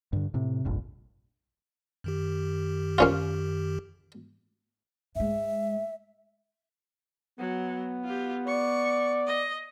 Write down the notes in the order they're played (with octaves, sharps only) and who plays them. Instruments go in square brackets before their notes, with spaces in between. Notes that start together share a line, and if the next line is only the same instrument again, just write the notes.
[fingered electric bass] G2 D3
A2 C3
F1 A#1 G2
[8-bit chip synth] F#2 D#3 G4
[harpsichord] A#3 C#4 F4
[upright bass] G#2 G#3 [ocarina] E5
[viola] F#3 [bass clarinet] B3
[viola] F4 G4
[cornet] D5 [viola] C#6
[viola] D#5